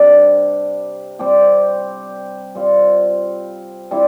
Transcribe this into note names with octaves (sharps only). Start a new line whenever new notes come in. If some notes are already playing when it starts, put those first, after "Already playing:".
Already playing: C3 G3 D4
G3 C4 G4
G3 C4 F4
G3 C4 E4 G4